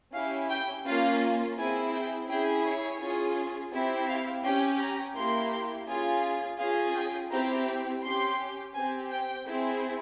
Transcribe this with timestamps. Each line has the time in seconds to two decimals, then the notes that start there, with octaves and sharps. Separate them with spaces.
0.13 C#4 E4 G4 F5
0.49 G5
0.86 A#3 C#4 F4 F5
1.57 C4 E4 G#4 G#5
1.93 G5
2.28 C#4 E4 G#4 G5
2.65 C#5
3.00 C#4 F4 G#4
3.72 C4 E4 G4
4.09 F5
4.44 C#4 G4 G5
4.80 A#5
5.15 A#3 E4 G4 C6
5.88 C#4 F4 G#4
6.59 C#4 F4 G#4 F5
6.94 G5
7.30 C4 E4 G4 A#5
8.03 C#4 G4 C6
8.74 C4 G4 G#5
9.11 G5
9.46 C4 E4 G#4